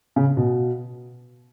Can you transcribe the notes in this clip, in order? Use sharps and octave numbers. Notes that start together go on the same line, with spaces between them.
C#3
B2